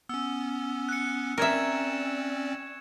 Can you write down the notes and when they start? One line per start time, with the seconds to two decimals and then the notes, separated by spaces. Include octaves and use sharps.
0.09 B3 C#4 E6
0.89 F#6 C#7
1.38 C4 C#4 A#4 D5 E5 C#6 G#6 E7